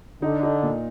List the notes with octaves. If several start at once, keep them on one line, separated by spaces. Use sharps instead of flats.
D3 D#4
D#4
A#2